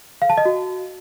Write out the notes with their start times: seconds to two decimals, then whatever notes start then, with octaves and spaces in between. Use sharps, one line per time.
0.22 F5
0.30 A5
0.38 D#5
0.45 F#4